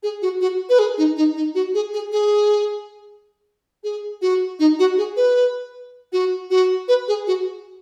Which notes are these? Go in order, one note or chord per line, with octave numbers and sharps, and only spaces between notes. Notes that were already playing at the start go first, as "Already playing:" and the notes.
G#4
F#4
F#4
B4
G#4
D#4
D#4
D#4
F#4
G#4
G#4
G#4
G#4
F#4
D#4
F#4
G#4
B4
F#4
F#4
B4
G#4
F#4